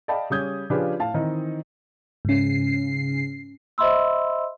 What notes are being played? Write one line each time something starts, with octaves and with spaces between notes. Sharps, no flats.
D5 D#5 F5 G5 A5 B5
C#3 G3 C#4 D#6 G6 G#6
C#3 F3 D4 G4 G#4 B4
A2 F5 A5
D#3 E3 C4 D#4 D#5
G#2 C#3 C#4 C7
C5 D#5 E5 B5 C6 E6